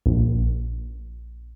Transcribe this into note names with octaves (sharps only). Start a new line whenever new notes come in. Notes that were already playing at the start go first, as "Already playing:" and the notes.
A#1